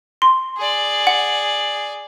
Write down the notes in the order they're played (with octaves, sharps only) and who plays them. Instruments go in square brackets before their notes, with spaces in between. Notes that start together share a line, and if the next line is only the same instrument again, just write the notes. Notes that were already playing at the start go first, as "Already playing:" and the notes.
[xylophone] C6
[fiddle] G#4 D5
[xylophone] F#5